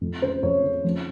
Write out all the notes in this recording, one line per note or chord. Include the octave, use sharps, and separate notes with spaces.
F2
C#3 C5
F2 C#5
C#3
F3